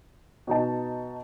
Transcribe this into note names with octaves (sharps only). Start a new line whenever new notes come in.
B2 D#4 A5